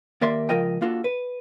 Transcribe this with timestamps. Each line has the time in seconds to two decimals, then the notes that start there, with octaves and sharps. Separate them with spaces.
0.21 D#2 A#3 D5 E5 C6
0.49 C#2 F3 F4 A#4 D#5 G5
0.81 A#3 D4 F4 F#4 A4
1.04 B4